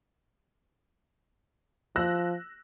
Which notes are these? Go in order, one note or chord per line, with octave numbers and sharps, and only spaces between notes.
F3 E6 F#6 A#6